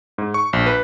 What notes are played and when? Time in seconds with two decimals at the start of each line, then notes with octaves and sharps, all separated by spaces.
0.18 G#2
0.34 C#6
0.53 A#1
0.66 B4